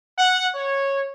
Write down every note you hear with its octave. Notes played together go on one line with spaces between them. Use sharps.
F#5
C#5